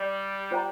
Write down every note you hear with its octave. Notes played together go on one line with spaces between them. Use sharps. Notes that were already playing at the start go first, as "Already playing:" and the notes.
Already playing: G3
F4 C5 G5 A#5